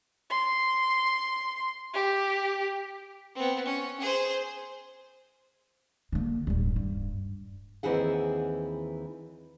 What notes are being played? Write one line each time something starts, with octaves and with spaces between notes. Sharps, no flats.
C6
G4
B3 C4
C#4
G#4 C5
D3 A#3
D1 G2
G2
D#2 E3 C4 G#4 F#5